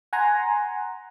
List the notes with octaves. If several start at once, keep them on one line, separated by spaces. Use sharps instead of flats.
F#5 G#5 A#5 C6